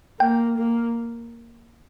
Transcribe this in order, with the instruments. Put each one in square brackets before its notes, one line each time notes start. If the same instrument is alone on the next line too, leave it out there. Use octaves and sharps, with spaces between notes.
[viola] A#3 [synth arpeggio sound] G5
[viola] A#3